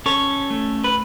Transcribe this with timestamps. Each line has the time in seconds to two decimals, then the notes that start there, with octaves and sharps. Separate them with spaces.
0.06 C#4 A4 C#5
0.50 A3
0.84 B4